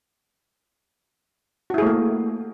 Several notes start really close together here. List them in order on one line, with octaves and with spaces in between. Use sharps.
F#4 E4 G#4 A3 A#3